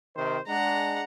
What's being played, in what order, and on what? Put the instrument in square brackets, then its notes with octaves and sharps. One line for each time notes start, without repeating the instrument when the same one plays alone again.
[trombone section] C3 D#3 C5
[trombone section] G#3 D4 [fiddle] F#5 A#5